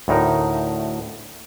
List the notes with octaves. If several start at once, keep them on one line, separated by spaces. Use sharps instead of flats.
D2 A2 D#4 A#4